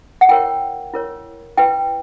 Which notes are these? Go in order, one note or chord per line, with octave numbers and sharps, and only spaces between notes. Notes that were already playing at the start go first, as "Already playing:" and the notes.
F#5
E4 A#4 C#5 G5
E4 A#4 C#5
E4 B4 G5